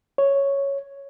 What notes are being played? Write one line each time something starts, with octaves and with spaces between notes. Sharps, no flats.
C#5